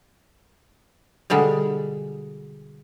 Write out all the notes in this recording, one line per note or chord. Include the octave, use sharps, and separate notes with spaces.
B2 D3 G3 G#3